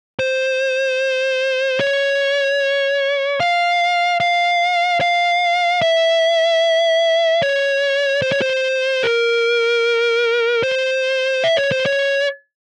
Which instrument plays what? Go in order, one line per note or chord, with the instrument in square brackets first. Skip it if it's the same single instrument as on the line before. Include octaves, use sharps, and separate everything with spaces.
[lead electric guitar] C5
C#5
F5
F5
F5
E5
C#5
C5
C#5
C5
A#4
C5
E5
C#5
C5
C#5